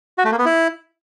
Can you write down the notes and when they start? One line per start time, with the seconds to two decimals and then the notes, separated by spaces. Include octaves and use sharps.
0.18 F#4
0.25 A3
0.32 A#3
0.38 B3
0.45 E4